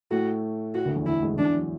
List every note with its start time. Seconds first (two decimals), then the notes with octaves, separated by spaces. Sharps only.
0.11 A2 A3 F#4
0.74 A2 F#4
0.85 D2 D3
0.96 E2 E3
1.06 E2 E3 E4
1.23 G#2 G#3
1.33 D3
1.38 E2 E3 D4
1.55 F#3